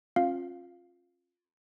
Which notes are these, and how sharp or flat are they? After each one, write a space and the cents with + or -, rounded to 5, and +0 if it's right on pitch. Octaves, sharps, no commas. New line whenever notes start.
C#4 -45 F4 +10 F5 +0